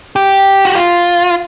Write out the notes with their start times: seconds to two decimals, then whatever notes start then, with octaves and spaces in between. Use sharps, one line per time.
0.16 G4
0.65 F#4
0.75 F4